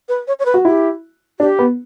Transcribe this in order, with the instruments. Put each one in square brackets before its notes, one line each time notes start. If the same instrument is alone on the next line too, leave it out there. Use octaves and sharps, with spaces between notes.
[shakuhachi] B4
C#5
C#5
B4
[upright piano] F#4
[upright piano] E4 [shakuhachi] G4
[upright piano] D4 [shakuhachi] G4
[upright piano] B3